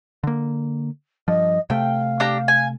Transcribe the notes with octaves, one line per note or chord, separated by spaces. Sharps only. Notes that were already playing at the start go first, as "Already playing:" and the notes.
D3 A#3
G2 F3 D#5
C3 A3 F5 G5
D4 G4 A#5
G#5